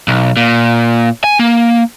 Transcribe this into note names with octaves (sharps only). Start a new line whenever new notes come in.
B1
A#2
G#5
A#3